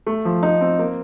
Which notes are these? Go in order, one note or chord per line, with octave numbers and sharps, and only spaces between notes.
A3
F3
D#4
C4
A#3